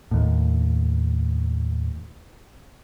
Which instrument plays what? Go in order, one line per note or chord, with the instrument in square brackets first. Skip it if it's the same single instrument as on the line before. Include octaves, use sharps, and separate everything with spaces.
[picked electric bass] D#2 A2